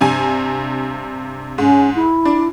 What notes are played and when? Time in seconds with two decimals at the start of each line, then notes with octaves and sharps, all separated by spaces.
0.01 G2 C3 G#5
1.58 G#2 C#4
1.95 E4
2.25 D4